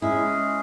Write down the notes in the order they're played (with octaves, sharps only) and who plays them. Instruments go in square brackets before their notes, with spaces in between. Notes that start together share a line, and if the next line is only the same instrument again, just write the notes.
[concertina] G#3 C#4 G#4 [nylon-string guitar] E4